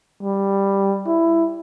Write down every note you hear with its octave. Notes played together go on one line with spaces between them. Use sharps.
G3
E4